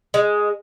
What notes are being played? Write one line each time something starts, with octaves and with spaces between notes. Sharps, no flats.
G#3